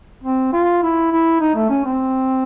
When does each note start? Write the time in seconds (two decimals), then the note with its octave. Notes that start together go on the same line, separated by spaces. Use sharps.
0.24 C4
0.53 F4
0.83 E4
1.12 E4
1.40 D#4
1.55 A3
1.70 C#4
1.85 C4